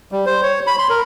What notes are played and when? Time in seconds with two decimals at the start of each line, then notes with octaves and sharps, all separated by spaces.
0.12 G3
0.26 C5
0.43 C#5
0.67 B5
0.78 C6
0.90 A#4